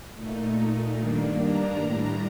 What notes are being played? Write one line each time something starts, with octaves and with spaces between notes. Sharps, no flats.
A#2 A3 D#4
G2 D#3 A#3 D4
A#5
A2 G3 D4